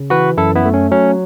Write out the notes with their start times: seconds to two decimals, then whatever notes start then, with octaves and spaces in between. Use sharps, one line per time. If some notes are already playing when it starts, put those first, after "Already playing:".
Already playing: C#3
0.10 E3 F#4 B4
0.37 F#2 E4 A4
0.55 B3 E4
0.65 A3
0.74 C#4
0.91 F#3 C#4